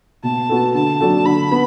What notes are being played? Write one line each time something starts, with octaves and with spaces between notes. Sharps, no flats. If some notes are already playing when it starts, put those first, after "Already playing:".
B2 A5
B3 F#4 A4
D3 A5
F#3 D4 F#4 A4
D3 B5
B3